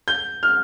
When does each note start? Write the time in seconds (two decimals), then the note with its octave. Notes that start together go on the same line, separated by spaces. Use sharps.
0.08 G6
0.43 F6